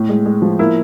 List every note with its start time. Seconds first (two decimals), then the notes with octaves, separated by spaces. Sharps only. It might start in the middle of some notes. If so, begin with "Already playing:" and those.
Already playing: A2
0.09 G#3
0.26 G#3
0.42 F3
0.59 A#3 E4